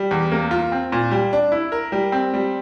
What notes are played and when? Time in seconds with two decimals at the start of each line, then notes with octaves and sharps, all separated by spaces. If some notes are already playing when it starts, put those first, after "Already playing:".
Already playing: G3
0.11 E2
0.32 A#3
0.51 F4
0.72 C4
0.92 A#2
1.11 G3
1.33 D4
1.52 E4
1.72 A#4
1.92 G3
2.12 C4
2.34 G3